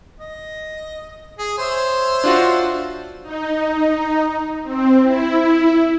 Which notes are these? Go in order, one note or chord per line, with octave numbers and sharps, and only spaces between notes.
D#5
G#4
C5 C#5 E5
D4 F4 F#4
D#4
C4
E4